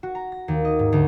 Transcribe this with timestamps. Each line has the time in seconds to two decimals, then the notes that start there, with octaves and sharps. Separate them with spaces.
0.03 F#4
0.15 A#5
0.32 A#6
0.48 D#2
0.65 D#5
0.79 G#2
0.92 D2